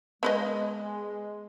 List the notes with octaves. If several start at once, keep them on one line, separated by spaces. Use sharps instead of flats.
G#3 B3 B4 D#5